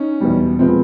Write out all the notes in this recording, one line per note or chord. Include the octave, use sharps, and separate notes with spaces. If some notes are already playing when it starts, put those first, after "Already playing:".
Already playing: C#4 D#4
E2 B2 G3
A#2 F3 G#3 B3 C4